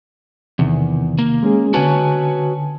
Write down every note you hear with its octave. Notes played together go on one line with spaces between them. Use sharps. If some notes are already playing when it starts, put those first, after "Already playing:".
E2 C3 D#3
A#3
G#3 C#4 G#4
D3 F#4 B4 C#5 G#5 A5